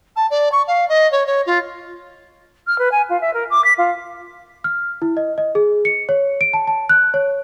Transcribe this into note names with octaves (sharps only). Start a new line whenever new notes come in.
A5
D5
C#6
F5
D#5
C#5
C#5
F4
F6
B4
G#5
F4
E5
A#4
D6
B6
F4
F6
E4
D#5
D#5
G#4
C#7
C#5
D7
A5
A5
F#6
C#5